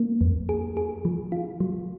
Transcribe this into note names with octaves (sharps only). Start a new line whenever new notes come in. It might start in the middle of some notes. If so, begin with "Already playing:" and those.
Already playing: A#3
F2
G#4
G#4
F3
F4
F#3